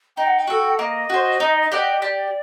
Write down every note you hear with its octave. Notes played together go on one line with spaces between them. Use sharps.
D#4 G5
F#5
G5
F#4 A4
F#5
A#3 D#5
F#4 C5
D#4
G4 D5 F#5
G4 D5